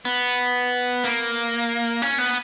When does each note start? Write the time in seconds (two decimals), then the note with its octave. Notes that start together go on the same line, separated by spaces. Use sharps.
0.05 B3
1.04 A#3
2.02 C#4
2.18 B3